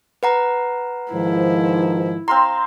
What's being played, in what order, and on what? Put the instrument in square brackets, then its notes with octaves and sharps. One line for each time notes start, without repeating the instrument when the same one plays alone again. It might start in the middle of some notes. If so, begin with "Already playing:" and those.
[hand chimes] B4 F#5 A#5
[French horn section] G#2 D#3 F3 [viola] E4
[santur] C4 F5 C6 [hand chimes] A#5